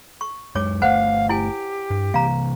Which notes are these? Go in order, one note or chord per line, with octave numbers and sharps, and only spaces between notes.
C#6
F#2 G#3 C#5 D6
G1 A3 B4 C5 F5 F#5
E4 G4 G#5
G2
C3 E3 A#3 F5 A#5